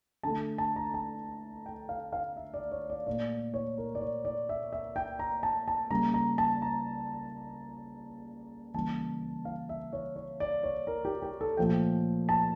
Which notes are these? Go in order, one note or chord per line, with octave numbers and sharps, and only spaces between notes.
D3 A3 A5
A5
A#5
A5
G5
F5
F5
E5
D5
C#5
D5
A#2 A3 D5
C#5
A#4
D5
C#5
D5
E5
E5
G5
A#5
A5
A5
C#3 G3 A#3 A#5
A#5
A5
A#5
C#3 E3 G3 A#3 A5
F5
E5
C#5
C#5
D5
C#5
A#4
G4
G4
A4
A#2 F3 A3 G5
A5